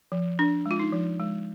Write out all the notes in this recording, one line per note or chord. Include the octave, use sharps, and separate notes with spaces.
F3
D4
G#3
F4
D#4
F3
G#3